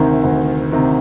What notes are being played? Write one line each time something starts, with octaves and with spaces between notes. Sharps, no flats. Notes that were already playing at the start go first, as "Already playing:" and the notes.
Already playing: D2 C3 D#3
D2
C3 D#3